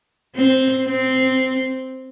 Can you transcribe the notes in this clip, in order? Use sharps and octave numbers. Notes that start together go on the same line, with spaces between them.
C4
C4